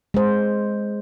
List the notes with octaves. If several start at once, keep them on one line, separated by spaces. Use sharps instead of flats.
G#3 C5